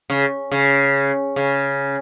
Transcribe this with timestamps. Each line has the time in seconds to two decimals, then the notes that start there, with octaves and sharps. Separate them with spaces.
0.10 C#3
0.52 C#3
1.36 C#3